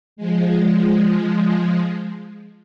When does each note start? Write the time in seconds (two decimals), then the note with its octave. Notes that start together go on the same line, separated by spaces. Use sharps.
0.16 F3 G#3